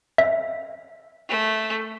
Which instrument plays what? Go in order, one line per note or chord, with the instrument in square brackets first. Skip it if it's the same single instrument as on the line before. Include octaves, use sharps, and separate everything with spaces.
[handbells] E5
[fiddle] A3